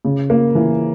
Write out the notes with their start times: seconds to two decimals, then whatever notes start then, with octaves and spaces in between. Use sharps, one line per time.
0.05 C#3
0.30 A#3
0.55 E3